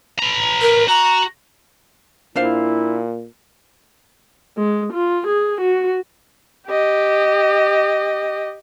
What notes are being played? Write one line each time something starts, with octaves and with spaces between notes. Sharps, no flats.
B4 A#5
A#4
F#4 A#5
A#2 D4 E4 C5 F5
G#3
F4
G#4
F#4
G4 D#5